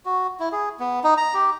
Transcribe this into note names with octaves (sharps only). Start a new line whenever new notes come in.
F#4
E4
G#4
B3
D#4
A#5
G4